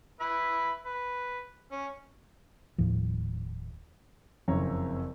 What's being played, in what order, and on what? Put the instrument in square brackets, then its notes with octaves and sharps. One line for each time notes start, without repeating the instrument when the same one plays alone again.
[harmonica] B4 E5 B5
B4
C#4
[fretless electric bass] D#1 D#2 A2 F3
[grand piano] F#1 F2 C4 C#4 C#5 A#5